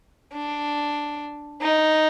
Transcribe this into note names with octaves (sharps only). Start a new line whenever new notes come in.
D4
D#4